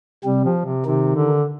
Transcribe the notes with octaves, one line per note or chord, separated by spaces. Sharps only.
C3 G3 C4
F3
C3
C3 D#3 D#4
D3